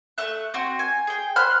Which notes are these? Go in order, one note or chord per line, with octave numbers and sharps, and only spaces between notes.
A3 E5 F#6
C4 F#4
G#5
G#4 G5
C5 B5 F6 F#6